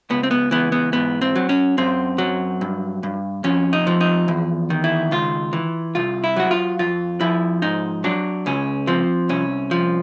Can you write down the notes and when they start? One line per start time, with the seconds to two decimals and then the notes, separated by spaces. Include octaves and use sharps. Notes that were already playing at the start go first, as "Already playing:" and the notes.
0.10 C#2 B3
0.23 C4
0.31 B3
0.51 E3 B3
0.72 B3
0.93 G#2 B3
1.22 C4
1.36 F#3
1.49 C#4
1.78 F#2 C4
2.18 F#3
2.61 G2
3.03 G2
3.44 F2 C#4
3.73 D#4
3.87 F3
4.01 D#4
4.28 E2
4.70 D#3
4.84 E4
5.11 C#2 F4
5.53 E3
5.95 C2 F4
6.24 E4
6.37 F#3 F#4
6.51 F4
6.79 F2 F4
7.21 F3 E4
7.62 G#2 D#4
8.04 F#3 D4
8.46 C#2 C#4
8.87 F3 C4
9.29 C2 C#4
9.71 F3